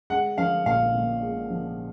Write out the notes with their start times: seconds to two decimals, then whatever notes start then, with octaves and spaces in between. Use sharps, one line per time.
0.10 G#3 F#5
0.38 F3 F5
0.66 A#1 F5
0.94 A#2
1.22 G#3
1.50 F3